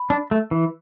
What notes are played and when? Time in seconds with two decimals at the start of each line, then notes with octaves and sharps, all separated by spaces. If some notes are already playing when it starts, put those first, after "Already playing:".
Already playing: B5
0.10 D4
0.31 A3
0.51 E3